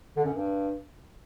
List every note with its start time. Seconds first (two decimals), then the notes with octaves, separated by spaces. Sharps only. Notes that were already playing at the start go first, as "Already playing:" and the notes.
0.16 D3
0.25 F#2
0.33 G2